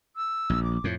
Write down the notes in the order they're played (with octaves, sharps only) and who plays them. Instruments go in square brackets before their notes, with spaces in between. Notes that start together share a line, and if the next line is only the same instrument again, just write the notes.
[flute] E6
[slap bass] A#1
[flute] D6
[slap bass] F2 A2